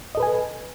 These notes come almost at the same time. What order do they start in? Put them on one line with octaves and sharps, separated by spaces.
D#5 A4 B4 G#5